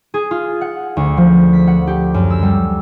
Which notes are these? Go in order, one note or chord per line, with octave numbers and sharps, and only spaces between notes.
G#4
F4
F#5
D2
F3
B6
F#5
G4
F#2
E6
G3